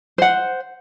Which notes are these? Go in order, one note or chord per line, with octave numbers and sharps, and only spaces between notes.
C5 F#5